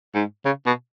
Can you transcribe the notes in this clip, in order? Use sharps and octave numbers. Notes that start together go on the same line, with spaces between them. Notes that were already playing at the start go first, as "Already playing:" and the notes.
G#2
C#3
B2